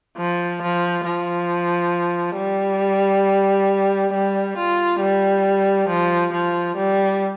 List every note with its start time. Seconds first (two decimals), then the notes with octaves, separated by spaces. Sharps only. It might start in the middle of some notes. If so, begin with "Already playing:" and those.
0.18 F3
0.62 F3
1.06 F3
2.38 G3
4.13 G3
4.58 F4
5.01 G3
5.89 F3
6.33 F3
6.77 G3